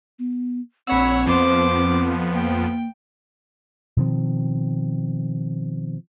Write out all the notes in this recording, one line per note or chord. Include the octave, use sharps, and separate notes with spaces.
B3
A#1 C4 C#5 F#5 B5 E6
F2 F3 B3 C5 D6
C4
A#3 G5
B2 D#3 F3 C4